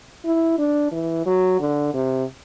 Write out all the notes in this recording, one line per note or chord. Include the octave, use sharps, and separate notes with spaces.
E4
D4
E3
F#3
D3
C3